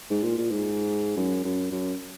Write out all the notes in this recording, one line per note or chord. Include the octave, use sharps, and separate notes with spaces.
G#2
A#2
A#2
G#2
F#2
F#2
F#2